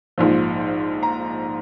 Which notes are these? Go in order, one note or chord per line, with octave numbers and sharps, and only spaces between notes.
A#1 G#2 F3
A#5